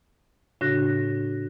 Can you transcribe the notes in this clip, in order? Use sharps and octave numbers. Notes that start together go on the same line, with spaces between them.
A2 C#3 D4 F#4 F#6 A#6